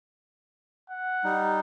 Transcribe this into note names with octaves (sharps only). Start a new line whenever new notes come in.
F#5
G3 D#4